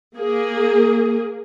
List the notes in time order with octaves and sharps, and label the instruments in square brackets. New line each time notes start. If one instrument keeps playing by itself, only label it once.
[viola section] A#3 G#4